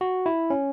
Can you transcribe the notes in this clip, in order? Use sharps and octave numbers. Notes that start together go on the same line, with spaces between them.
F#4
E4
C#4